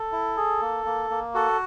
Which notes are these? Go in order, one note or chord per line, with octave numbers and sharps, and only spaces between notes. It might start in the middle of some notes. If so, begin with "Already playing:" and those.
Already playing: A4
E4
G#4
A#3
A#3
A#3
F#4 A4